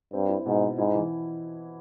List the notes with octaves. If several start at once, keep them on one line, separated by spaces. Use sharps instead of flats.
G2 C4
E4
G#2 B2
C4
G#2 E4
E3